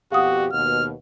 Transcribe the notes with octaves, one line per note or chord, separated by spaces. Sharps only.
F2 B2 F#4 G4 F5 F#5 D#6
D#2 B2 F6